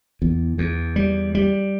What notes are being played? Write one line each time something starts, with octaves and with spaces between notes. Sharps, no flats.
E2
E2
G3
G3